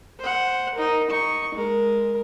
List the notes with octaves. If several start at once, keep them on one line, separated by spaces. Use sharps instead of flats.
C5 F#5
D#4 A#4
D#4 C#6
G#3 A#4